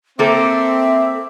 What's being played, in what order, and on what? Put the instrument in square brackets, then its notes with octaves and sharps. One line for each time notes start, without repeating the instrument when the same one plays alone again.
[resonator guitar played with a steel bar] A#3 A4 [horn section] C4 [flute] E5 [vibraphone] D6